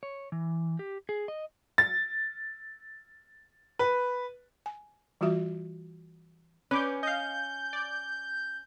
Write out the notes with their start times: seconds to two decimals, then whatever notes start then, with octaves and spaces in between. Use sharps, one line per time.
0.03 C#5
0.32 E3
0.79 G4
1.09 G#4
1.28 D#5
1.78 A6
3.79 B4
4.66 G#5
5.21 E3 G3 F4 F#4 E5
6.71 C#4 B4 D6 G6
7.03 D#5 F5 G6
7.73 D5